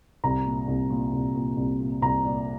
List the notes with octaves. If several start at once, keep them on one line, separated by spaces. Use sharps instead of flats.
C2 A#5
A#2
C2
A#2
C2
A#2
C2
A#2
C2 A#5
A#2 D5